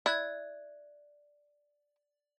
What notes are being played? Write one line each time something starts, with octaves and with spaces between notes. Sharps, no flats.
E4 D5 F#6 G#6